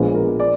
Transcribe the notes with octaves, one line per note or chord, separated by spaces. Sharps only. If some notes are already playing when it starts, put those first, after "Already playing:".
Already playing: A#1 A#2 G#3 B3
A#4
D5